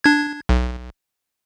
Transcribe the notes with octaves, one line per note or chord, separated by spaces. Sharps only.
D4 G#6
B1